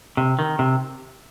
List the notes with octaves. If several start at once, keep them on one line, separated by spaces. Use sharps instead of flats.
C3
D#3
C3